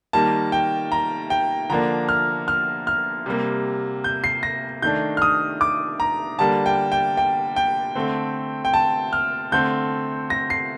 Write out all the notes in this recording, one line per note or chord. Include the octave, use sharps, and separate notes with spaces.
D#3 G3 A#3 A5
G5
A#5
G5
D3 F3 A#3 D4 A#5
F6
F6
F6
C3 G3 A#3
G6
C7
A#6
D#3 A3 D4 G6
F6
D#6
D6
A#5
D3 G3 A#3 D4 A5
G5
G5
G5
G5
D3 A3 C4
G5
A5
F6
D3 A3 C4 G6
A#6
C7